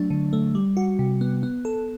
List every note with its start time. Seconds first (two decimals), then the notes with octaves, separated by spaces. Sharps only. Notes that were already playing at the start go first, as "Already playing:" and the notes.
Already playing: F#3 A3 D4
0.10 D3
0.33 A3
0.55 G3
0.77 F#4
0.99 C3
1.21 B3
1.43 B3
1.65 A4